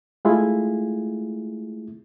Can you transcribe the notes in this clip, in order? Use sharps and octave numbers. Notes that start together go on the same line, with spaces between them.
G#3 A3 E4 F4 G#4